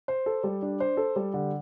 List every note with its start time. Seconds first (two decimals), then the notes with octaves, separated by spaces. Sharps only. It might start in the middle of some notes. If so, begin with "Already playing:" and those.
0.08 C5
0.26 A4
0.44 G3
0.62 D4
0.80 C5
0.97 A4
1.16 G3
1.34 D3